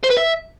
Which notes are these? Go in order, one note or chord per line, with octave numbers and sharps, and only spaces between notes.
C5
B4
E5